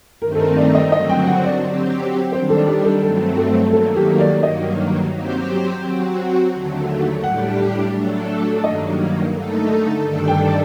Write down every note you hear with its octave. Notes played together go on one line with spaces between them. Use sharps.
G2 D#3 A3 C4 D#4 A#4
A4
A#4
D5
D#5
D3 F#3 C4 F#4 D#5
G5
F#5
D5
F#3 C4 G4
D#3 G3 D4 C5
A4
G4
A4
G2 F#3 A3 C4 A4
A4
D#3 F#3 A#3 A4
G4
D5
G2 D#3 F#3 A#3 D#5
F#3 C4 G4 C5
F#3 C4 F#4
D#2 D3 F#3 A3
A2 G3 D4 G4 F#5
F#3 A3 D4 A4
G2 D#3 F#3 A#3 D#5
D3 A3 D#4 A4
G2 D#3 G3 D4 A4
G5